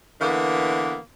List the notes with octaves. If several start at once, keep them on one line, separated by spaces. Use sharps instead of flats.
D3 E3 A#3 B3